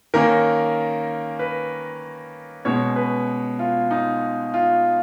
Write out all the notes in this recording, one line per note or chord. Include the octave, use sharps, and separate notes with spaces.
D#3 A#3 C#4 A#4
B4
B2 G#3 C#4 C#5
B4
F4
D#4
F4